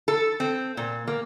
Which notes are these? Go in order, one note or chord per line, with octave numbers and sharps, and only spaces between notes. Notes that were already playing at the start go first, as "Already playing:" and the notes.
A4
C4
A#2
A#3